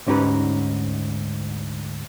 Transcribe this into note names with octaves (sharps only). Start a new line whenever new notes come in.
D2 G#2 C#4 D#4 G4 B4